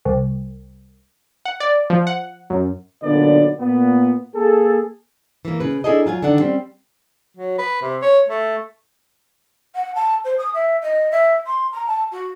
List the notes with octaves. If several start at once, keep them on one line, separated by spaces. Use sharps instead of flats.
C2
F#5
D5
F3
F#5
F#2
B1 A#2 D3 B3 B4 D5
A#2 B3
A#3 G#4 A4
E3 A#3
C#3 B4
D4 E4 G#4 A4 D#5
F#3 F4 F#5 G#5
D3 D#3 D4 F#5
G3 C4 C#4
F#3
B4
C3
C#5
A3
F#5
A5
C5
D#6
E5
D#5
E5
C6
A#5
A5
F#4